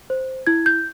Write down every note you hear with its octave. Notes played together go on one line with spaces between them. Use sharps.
C5
E4 G#6
G6